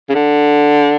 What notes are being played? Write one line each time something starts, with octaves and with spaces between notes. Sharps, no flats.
C#3
D3